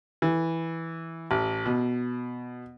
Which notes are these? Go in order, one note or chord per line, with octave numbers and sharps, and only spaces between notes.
E3
A1
B2